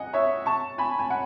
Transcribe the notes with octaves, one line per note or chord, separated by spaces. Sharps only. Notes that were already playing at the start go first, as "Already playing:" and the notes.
Already playing: D#5 F#5 G#5
C#5 E5
A5 C#6
G#5 B5
G#5
F#5